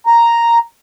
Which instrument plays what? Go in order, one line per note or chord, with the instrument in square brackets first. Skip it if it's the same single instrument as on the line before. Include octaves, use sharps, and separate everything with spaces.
[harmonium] A#5